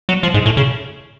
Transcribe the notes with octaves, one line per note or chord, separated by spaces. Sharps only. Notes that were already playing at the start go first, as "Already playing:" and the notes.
F#3
F3
G#2
A2
C#3